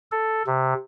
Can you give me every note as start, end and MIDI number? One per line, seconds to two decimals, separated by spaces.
0.12 0.43 69
0.47 0.74 48